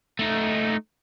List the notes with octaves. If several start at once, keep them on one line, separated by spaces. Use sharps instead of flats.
A3 D#4